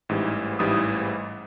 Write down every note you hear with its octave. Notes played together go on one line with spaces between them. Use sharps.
A1 G#2 E3 G3
A1 G#2 E3 G3 D#6